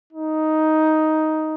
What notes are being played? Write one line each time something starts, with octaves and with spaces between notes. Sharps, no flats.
D#4